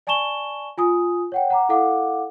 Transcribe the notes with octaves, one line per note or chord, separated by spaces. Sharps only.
D5 G#5 A5 C#6 E7 G7
F4 G#5 D#6
C#5 F#5 G5
F#5 A#5 D6
E4 A4 F5 F#5 D6